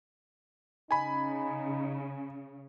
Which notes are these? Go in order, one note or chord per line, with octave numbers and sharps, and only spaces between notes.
C#3 D#4 G#5 B5